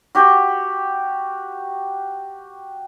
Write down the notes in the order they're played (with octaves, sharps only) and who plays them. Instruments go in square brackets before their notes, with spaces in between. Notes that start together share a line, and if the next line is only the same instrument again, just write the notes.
[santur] F#4 G4